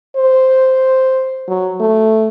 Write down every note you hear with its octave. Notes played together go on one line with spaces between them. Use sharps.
C5
F#3
A3